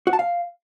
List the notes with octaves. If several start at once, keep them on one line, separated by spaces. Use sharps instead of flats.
F#4
A5
F5